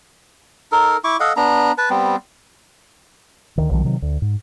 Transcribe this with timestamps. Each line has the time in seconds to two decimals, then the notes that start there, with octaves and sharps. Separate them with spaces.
0.72 D#4 A4 A#4
1.04 E4 C#6 D6
1.20 A4 D#5 F5 F#5
1.37 B3 D4 A#5
1.78 B4 A5
1.90 G3 B3 C4
3.58 D2 D#3
3.71 B1 D#3 F3 F#3
3.84 C3 D#3 F#3
4.02 D2
4.22 G#2